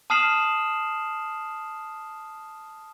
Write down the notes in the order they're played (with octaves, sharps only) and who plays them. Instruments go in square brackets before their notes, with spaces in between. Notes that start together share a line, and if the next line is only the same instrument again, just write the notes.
[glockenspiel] A5 D#6 F6 C7 E7 F#7